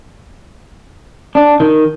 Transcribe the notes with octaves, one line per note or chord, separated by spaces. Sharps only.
D4
D#3